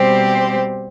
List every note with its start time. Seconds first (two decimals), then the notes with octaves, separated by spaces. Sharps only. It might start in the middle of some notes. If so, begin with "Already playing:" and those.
Already playing: B2 G3 C4 G4 C5